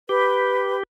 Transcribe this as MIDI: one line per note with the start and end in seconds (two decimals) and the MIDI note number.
0.09 0.83 67
0.09 0.76 71